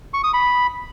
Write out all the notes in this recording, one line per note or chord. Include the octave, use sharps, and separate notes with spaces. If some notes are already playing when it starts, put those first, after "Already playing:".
C#6
D#6
B5